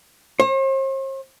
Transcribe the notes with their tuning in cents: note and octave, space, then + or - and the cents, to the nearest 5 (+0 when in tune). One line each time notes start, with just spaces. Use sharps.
C5 +45